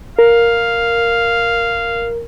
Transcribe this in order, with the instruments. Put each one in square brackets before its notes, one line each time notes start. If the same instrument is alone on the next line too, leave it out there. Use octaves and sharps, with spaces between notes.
[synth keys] A#4 [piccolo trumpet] F5